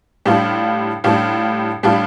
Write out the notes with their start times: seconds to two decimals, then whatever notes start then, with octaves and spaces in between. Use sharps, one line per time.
0.26 A2 G3 D4 F4
1.04 A2 G3 D4 F4
1.83 A2 G3 D4 F4